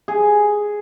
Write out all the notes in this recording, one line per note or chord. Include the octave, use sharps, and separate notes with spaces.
G#4